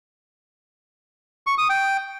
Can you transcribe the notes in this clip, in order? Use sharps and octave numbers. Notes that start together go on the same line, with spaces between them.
C#6
D#6
G5